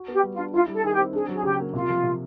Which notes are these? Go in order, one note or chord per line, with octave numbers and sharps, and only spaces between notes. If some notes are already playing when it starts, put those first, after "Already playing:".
Already playing: F#4
B3 G4
G3
F4
D4
E4 F4
G3
A4
D#3 G#4
G4
C4
D4 G#4
F#3
G#4
C#3 G4
A#3
C3 F4
F3
C3